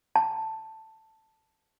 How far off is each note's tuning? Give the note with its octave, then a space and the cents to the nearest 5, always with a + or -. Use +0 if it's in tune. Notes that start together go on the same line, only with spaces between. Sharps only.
A5 +5